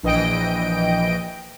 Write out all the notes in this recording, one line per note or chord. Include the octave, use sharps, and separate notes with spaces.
A#1 E3 D#5 G5 D7